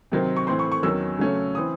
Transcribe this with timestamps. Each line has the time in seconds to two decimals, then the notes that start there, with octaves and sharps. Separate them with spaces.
0.12 C3 D#3 F#3 C4
0.36 C#6
0.47 A2 E3 C4 C6
0.59 C#6
0.72 C#6
0.83 E2 D#3 F#3 C#4 E6
1.19 C#3 F#3 A3 C#4
1.55 E3 C4 D#6